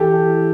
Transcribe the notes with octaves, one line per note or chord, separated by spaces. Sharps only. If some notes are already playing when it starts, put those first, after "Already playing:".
Already playing: E3 G4 A4